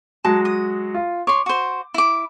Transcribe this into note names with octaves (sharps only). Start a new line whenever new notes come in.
F#3 G#3 F#4 A5
D#6
F4
C#5 C6 D6
F#4 C5
E4 D6